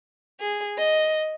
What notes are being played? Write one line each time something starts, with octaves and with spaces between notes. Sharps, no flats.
G#4
D#5